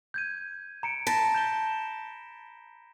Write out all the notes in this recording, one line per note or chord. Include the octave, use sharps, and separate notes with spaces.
G6 G#6 D#7
A#5 C#7 D7
A5 B5 A#6 B6
G6 E7 G7